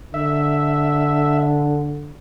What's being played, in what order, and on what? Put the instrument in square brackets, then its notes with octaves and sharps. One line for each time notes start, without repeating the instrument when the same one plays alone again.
[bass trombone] D3 [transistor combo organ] E5